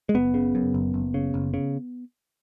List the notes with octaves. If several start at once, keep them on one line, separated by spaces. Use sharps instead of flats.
G#3
F#1 B3
C#3
F#2
F#1
F#1
C#3
F#1
C#3